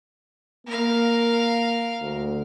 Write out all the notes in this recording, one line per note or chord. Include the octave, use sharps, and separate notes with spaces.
A#3 A#4 F5
D2